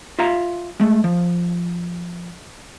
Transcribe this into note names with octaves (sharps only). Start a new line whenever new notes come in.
F4 E5 F5 A#5
G#3 A3
F3